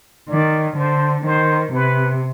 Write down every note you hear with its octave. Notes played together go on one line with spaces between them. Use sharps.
D#3 D5
D3 C5
D#3 C5
C3 B4